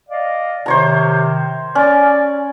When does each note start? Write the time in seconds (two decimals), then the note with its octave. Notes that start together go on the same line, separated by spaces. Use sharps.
0.09 D5 D#5 F5
0.66 C3 D#3 C5 C#5 A#5
1.75 C#4 D5